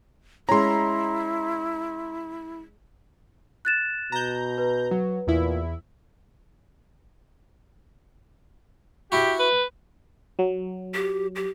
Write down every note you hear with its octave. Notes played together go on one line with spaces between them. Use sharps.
G#3 C#4 E4 A#5 C6
F#6 A6 E7
B2 A#5 G6
B4
F#3
E2 A#2 E4
E4 F#4 G4
B4
F#3
G4
G4